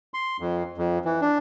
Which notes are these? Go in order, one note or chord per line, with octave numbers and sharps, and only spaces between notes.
C6
F2
F2
E3
D4